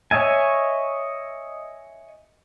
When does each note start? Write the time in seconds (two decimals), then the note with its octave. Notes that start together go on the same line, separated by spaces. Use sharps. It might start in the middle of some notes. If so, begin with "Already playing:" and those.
0.11 C#5 D#5 E5 G#5